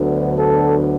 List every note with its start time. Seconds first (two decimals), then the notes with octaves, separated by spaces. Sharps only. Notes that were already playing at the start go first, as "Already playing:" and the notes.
Already playing: D2 D3 F#3 B3
0.37 A4